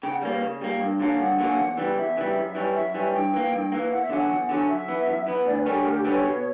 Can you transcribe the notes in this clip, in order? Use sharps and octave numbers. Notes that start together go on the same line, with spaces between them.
C#3 G5
F#5
G3 A#3 D5
B4
C#3
G3 A#3
G2
D3 F#3 A#3 C#4
G2 F#5
D3 F#3 A#3 C#4
E2
C#3 E3 G3
E2 E5
C#3 E3 G3
F#2
E3 G3 C#4
F#2 E5
E3 G3 C#4
G2 G5
E3 A#3
G2
E3 A#3
E2 F#5
E5
D3 F#3 C#4 F#5
E2
D3 F#3 C#4
F#2 E5
E3 B3
F#2
E3 B3
D2 D5
B4
D3 G3 C#4 A#4
G4
D2 A#4
G4
D3 G3 C#4 B4
C#5
B2